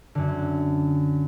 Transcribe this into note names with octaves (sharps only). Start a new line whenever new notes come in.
F#2 D3